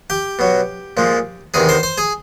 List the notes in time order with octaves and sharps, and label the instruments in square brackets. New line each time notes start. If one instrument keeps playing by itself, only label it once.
[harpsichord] G4 G5
B2 F#3
A#2 F3 G#3
E2 C3 D#3 G#4 G#5
C5 C6
C5 C6
G#4 G#5